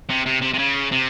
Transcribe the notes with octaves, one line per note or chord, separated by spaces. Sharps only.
C3
C3
C3
C3
C#3
C3